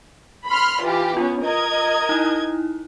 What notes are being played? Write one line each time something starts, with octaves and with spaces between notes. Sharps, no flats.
B5 C6 F6
E3 F4 G4
B3 C#4 F4
A#4 D#5 G#6
D#4 E4